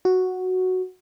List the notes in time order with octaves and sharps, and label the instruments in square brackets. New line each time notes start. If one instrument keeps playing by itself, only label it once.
[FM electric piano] F#4